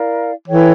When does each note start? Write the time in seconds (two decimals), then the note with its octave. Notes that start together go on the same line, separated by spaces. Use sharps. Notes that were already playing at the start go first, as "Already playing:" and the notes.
Already playing: E4 A#4 D5 F5
0.48 E3 A4 C#5 G5